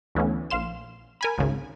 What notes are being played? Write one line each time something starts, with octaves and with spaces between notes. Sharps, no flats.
D2 E3 A3 B3 C#4
A#1 F5 C6 E7
A#4 G#5 B5
G#1 C#2 C#3